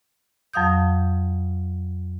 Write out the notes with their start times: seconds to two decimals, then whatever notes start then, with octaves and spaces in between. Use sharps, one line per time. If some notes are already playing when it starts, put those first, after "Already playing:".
0.53 F2 F#3 F5 D#6 G6